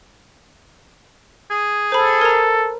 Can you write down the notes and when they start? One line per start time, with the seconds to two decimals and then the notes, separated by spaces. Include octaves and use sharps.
1.51 G#4
1.92 A4 C5 B5
2.22 A#4 A#5